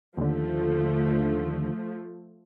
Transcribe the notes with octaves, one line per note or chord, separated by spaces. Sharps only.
D#2 D3 F3 A3